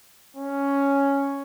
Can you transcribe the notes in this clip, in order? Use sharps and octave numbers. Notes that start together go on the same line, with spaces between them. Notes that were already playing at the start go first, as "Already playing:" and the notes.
C#4